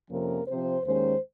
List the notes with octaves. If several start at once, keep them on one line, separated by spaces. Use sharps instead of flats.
F2 C3 F3 A#3 C#4 A#4
C3 F3 C4 C5
D#2 D#3 G#3 C#4 C5